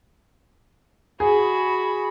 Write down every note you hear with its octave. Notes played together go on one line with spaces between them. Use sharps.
F#4 G#4 B5